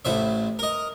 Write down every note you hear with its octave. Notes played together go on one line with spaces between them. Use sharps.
A1 A2 C5 E5
A#4 D#5